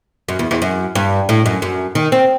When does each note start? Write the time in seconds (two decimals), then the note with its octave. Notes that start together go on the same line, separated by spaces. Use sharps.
0.29 F#2
0.39 E2
0.51 E2
0.62 F#2
0.95 G2
1.29 A2
1.46 F#2
1.62 F#2
1.95 D#3
2.12 C4